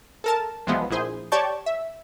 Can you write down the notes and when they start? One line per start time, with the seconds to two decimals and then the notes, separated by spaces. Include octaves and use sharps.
0.24 A4 A#4 A5
0.67 B1 E3 F3 G#3 B3
0.90 A#1 E4 G#4 C5
1.32 G4 C#5 D5 A5 C#6 G6
1.66 E5